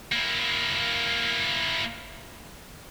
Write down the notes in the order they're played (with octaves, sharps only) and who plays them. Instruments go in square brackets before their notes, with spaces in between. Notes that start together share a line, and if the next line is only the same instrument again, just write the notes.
[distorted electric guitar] A#3 E4